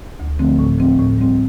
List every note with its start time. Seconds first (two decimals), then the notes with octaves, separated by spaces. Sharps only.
0.20 D2
0.39 D3 F3 A3 C4
0.59 A2
0.78 F3 C4
0.99 A2
1.18 G3 C4